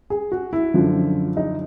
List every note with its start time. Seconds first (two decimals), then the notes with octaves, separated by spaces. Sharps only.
0.10 G#4
0.32 F#4
0.53 E4
0.74 F#2 D3 F3
1.37 D#4